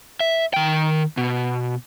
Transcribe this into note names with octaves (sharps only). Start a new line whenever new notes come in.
E5
D#3 G5
B2